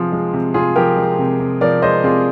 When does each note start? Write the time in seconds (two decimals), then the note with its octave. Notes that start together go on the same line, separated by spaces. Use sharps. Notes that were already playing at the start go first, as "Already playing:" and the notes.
Already playing: C3 F3 F4 G#4
0.12 G#3
0.34 C3
0.54 C3 F4 G#4
0.76 F3 G4 A#4
0.97 G#3
1.19 C3
1.40 C3
1.61 F3 A#4 D5
1.82 G#3 C5 D#5
2.04 C3 F4 G#4